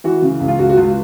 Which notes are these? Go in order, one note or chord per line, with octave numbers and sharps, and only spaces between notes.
E3 F#4
C#3
C#2
F4
C#2 F#4
F#4
C#2 F4